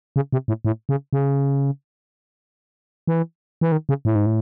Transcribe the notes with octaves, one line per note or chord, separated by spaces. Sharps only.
C#3
C3
A2
A2
C#3
C#3
E3
E3
D#3
C#3
A2
G#2
A2